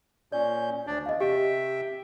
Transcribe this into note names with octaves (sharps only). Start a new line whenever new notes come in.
A#2 C#4 D5 G6
D2 D4 D5
E2 D#5 F5
C3 G4 E5 G5